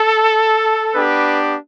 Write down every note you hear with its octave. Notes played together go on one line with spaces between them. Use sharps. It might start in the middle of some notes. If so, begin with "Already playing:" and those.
Already playing: A4
B3 D4 G4 B4